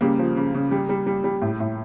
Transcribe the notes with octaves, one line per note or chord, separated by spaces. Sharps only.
C#3 G3 A#3
F3
C#3
C#3
G3
G3
G3
G3
A2
A2